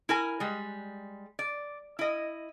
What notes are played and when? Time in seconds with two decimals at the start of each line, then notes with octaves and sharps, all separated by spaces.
0.09 E4 A#4 G#5
0.40 G3 G#3
1.39 D5
1.99 E4 D#5